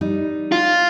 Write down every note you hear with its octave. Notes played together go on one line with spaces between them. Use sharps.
G3 D#4
F4